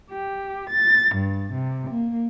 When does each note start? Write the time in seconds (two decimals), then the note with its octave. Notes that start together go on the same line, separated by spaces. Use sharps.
0.11 G4
0.70 A6
1.16 G2
1.53 C3
1.89 A#3